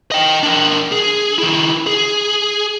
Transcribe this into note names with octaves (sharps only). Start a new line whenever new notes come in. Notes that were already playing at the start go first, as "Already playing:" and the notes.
D#5 G5
D4 A#4
G#4
D#3 E4
G#4